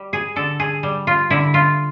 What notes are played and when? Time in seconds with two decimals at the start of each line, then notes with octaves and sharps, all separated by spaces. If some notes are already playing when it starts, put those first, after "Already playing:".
Already playing: G3
0.13 G#4
0.36 D3 A4
0.60 G#4
0.83 G3
1.07 F4
1.30 D3 E4
1.54 F4